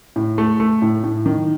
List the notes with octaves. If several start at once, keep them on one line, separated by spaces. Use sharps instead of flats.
A2
A3
A3
A2
A2
D#3